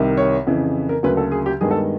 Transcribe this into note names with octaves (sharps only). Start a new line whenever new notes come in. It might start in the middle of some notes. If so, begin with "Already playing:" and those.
Already playing: C2 C3 D#3
C#5
F2 C#3 E3
A#4
D2 C#3 F#3 A#3 B4
A4
G#4
G4
G2 D#3 G#3 B3 G#4
A4